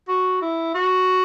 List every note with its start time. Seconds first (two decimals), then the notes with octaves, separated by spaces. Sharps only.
0.08 F#4
0.41 E4
0.75 F#4